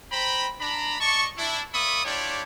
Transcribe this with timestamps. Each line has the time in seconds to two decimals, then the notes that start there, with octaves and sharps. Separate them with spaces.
0.12 C5 G5 A#5 B5
0.60 D4 A#5 B5
1.00 D5 D#5 A5 C#6
1.37 D4 E4
1.73 A#3 D5 E5 B5 C#6 D#6
2.05 D4 E4 F4 G4 C#5 D5